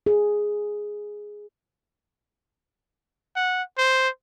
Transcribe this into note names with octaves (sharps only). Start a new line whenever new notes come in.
G#4
F#5
C5